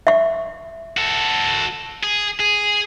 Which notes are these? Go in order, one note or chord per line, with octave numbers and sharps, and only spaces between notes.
E5 C#6
F#4 A4
G#4
G#4